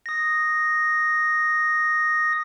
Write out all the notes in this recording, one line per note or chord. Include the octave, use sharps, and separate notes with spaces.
D#6 A#6